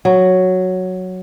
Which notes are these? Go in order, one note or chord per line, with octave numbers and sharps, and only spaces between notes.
F#3